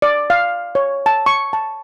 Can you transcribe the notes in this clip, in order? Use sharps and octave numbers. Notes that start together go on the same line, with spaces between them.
D5
F5
C#5
A5
C#6
A5